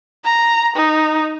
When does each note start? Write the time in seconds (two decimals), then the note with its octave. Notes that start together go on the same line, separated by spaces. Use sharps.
0.25 A#5
0.76 D#4